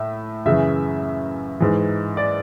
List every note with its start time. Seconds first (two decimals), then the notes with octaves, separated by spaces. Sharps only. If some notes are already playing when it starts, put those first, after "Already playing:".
Already playing: A2 E5
0.45 F#2 C#3 E3 E5
1.60 G#2 E3
2.17 D5